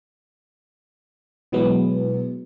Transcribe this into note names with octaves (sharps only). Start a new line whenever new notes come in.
B2 E3 F#3 G#3 B3